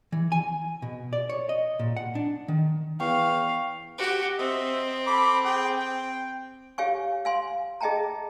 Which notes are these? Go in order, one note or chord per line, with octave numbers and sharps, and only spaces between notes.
E3
G#5
B2
D5
C#5
D#5
A#2
F#5
D4
D#3
E2 F5 G5 C#6
F#4 G4
C4 D#5 E5
A4 B5 D6
G#4 G5
G5
G4 C#5 F5 G#5 C#6
F5 G#5 C6
G#4 D#5 E5 G5 A5 A#5